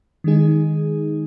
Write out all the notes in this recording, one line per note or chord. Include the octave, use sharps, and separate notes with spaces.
D#3 G#3 D#4 G#4